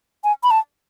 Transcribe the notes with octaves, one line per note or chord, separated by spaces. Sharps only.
G#5
B5
A5